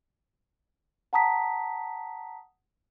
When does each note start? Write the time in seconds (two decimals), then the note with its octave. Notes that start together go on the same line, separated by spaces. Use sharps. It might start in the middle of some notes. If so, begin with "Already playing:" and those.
1.13 F#5 A5 A#5 D#6 B6